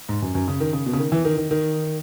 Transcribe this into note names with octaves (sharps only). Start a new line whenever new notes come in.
G#2
F#2
F#2
C#3
D#3
C#3
B2
C#3
D#3
E3
D#3
D#3
D#3